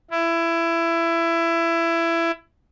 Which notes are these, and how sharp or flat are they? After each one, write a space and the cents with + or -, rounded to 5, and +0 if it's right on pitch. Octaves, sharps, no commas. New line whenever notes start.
E4 +20